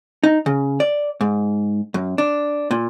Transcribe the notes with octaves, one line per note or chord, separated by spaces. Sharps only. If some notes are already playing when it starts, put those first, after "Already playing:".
D#4
C#3
D5
G#2
F#2
D4
A#2